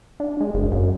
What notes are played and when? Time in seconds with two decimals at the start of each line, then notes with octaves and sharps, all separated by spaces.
0.20 D4
0.41 G#3
0.54 F#1
0.72 F#2